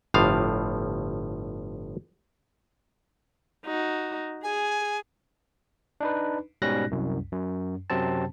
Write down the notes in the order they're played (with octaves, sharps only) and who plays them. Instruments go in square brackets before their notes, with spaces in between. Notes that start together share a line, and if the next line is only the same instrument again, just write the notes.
[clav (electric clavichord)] G1 A2 F3 F5
[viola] D#4 F#4
[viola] G#4 [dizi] G#5
[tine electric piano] D4 D#4 B4
G#2 B2 G3 C#4 F#6 A#6
C2 F#2
F#2
F#2 C3 F#3 C4 A5